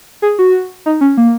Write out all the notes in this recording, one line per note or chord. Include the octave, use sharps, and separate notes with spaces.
G#4
F#4
D#4
C#4
A#3